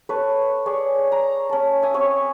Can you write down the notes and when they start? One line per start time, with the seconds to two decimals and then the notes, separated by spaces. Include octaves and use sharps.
0.09 A4 B4 C#5
0.66 G#4 C#5 D5
1.12 A#5
1.49 C#4 A5
1.82 E5 G#5 D#6
1.94 C4 C#5 C#6